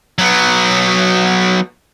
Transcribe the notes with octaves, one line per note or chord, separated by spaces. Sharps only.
F#3 B3